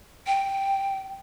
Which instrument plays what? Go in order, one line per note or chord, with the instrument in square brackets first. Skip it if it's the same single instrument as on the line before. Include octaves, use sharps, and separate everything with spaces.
[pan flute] G5